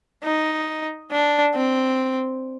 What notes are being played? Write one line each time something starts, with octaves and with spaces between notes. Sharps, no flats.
D#4
D4
C4